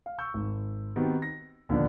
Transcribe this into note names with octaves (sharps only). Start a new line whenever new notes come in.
F5
C#6 E6 G6
G#1
D#3 B3 C4 F#4 G4
A#6
D#2 A#2 D3 F3 B3 D4